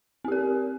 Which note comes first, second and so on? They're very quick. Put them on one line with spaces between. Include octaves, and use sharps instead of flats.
C4 G4 A#4